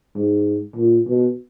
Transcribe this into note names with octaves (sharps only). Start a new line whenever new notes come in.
G#2
A#2
B2